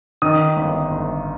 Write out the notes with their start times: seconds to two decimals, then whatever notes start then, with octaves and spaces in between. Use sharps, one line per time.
0.22 D#3 D#6
0.57 G1
0.91 G1